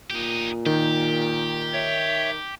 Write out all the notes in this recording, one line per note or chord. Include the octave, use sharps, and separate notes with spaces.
A#2 D#4 G4
D#3 G4
C#5 E5